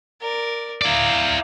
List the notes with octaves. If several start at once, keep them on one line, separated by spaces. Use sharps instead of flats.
A#4 D5
E4 D5 F5 A#5